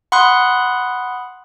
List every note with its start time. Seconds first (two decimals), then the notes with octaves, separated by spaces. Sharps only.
0.12 F#5 B5 C6 D#6 F#6